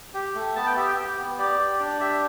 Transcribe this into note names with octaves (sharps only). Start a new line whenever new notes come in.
G4
A3
B3 A5
G5
G4 E5
G5
G4
B3
G4 D5
G4
D4 D5
G4 E5